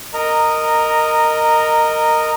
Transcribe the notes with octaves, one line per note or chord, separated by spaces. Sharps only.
A#4 D#5 A#5